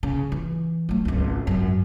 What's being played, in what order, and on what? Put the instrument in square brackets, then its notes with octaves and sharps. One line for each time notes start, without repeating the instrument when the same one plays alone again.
[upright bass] C#3
E3
F#3 A3
G#1 C#2
G#1 F#2